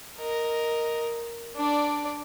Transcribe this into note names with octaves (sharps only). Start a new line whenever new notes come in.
A#4 D#5
D4 D5